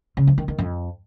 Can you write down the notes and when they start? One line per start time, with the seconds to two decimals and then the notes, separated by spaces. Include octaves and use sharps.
0.17 C#3
0.27 F3
0.38 D#3
0.48 D#3
0.58 F2